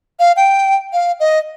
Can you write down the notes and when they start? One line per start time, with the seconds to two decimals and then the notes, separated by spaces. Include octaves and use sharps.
0.19 F5
0.37 G5
0.93 F5
1.20 D#5